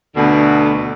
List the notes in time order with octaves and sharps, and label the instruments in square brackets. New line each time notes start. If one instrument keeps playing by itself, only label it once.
[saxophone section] D2 B2 D3